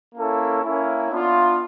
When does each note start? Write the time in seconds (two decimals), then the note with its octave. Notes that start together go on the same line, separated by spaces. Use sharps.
0.15 A#3 C#4 E4 A4
0.63 A#3 C#4 E4
1.11 B3 D4 F4